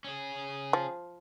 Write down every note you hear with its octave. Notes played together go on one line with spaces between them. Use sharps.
C#4 G#4
F3